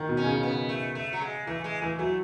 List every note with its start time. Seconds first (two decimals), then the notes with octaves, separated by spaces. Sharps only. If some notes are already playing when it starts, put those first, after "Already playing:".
Already playing: D#3
0.09 B2
0.17 C#4
0.26 C#3
0.43 B3
0.69 A3
0.95 A3
1.13 F#3
1.21 G#3
1.47 E3 A3
1.64 G#3
1.82 E3 A3
1.99 F#3 A3